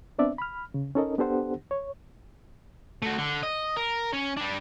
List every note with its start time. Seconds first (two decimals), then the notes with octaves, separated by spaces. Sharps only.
0.18 B3 C4 D4 D5 E5
0.38 B5 F6
0.74 C#3
0.95 C#4 D#4 A4 A#4 D#5
1.18 B3 D4 G4 A4 C5 F#5
1.71 C#5
3.02 A3 F#4
3.18 D3
3.43 D#5
3.76 A#4
4.13 C#4
4.37 G3 D4